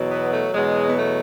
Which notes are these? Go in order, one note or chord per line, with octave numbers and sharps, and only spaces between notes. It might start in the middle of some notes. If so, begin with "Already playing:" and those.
Already playing: E2 B2 F#3
B3
A3
E2 B2 F#3 G#3
B3
A3